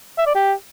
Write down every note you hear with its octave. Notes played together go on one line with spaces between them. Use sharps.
E5
D5
G4